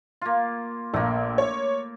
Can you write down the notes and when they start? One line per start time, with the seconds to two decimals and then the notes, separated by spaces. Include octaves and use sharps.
0.21 A#3 F4
0.94 A#1 A3 A#3
1.38 C#5